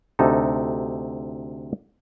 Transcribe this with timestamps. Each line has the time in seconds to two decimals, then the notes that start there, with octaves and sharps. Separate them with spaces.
0.19 D2 C3 D#4 A4